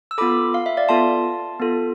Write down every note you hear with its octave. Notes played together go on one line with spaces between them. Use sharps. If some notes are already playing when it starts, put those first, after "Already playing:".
E6
B3 F4 A4 B5 D6
F5
E5
D5 F5
B3 F4 A4 A5 C6
B3 F4 A4